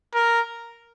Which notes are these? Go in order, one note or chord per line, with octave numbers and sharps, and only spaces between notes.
A#4